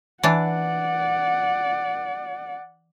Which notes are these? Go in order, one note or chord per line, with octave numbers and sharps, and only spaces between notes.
E3 D4 D5 F#5